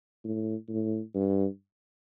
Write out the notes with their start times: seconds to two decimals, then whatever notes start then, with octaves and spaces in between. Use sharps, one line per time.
0.24 A2
0.69 A2
1.14 G2